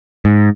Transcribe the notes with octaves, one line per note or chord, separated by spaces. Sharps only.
G#2